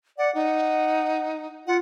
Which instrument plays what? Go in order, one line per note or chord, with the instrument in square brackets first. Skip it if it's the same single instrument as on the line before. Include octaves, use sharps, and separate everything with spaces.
[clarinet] D5 [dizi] F#5
[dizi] D#4 [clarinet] F#5
[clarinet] F4 [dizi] F#5